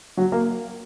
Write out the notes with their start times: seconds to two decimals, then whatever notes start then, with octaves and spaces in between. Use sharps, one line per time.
0.17 F#3
0.32 A#3